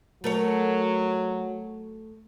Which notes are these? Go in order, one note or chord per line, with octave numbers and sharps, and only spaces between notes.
F#3 A3 A#4 C#5